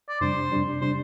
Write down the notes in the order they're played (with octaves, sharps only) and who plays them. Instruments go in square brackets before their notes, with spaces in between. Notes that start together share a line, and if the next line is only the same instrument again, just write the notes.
[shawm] D5
[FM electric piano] F2 C3 G3 D4 [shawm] C5
[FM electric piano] F2 C3 G3 D4
[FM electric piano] C3 G3 D4 [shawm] C5